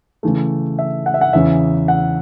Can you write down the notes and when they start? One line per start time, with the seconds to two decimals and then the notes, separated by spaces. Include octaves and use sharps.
0.23 C#3 E3 A3
0.79 E5
1.06 F#5
1.14 E5
1.21 F#5
1.33 E2 C#3 E3 C#4 E5
1.88 F#5